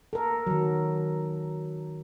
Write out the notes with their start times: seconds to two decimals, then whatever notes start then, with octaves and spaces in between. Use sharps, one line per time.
0.13 A4 A#4
0.47 D#3 F#3